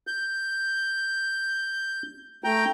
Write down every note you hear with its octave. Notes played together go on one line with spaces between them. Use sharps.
G6
A3 G5 A#5 G6